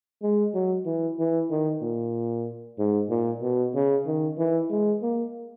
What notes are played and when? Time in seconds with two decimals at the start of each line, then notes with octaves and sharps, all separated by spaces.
0.22 G#3
0.54 F#3
0.86 E3
1.19 E3
1.51 D#3
1.82 A#2
2.78 G#2
3.10 A#2
3.42 B2
3.75 C#3
4.06 D#3
4.38 E3
4.70 G#3
5.02 A#3